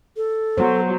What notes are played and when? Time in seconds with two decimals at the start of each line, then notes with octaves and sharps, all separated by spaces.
0.17 A4
0.58 F#3 B3 C5